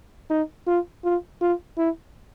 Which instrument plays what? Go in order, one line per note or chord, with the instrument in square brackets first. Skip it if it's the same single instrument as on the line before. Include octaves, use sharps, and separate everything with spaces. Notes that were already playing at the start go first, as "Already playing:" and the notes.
[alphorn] D#4
F4
F4
F4
E4